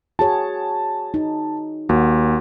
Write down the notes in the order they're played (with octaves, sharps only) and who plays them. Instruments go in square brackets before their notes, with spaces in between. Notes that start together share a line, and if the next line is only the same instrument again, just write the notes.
[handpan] F#4 G#4 C#5 [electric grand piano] A5
[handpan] D#4
[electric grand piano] D#2 [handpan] F#4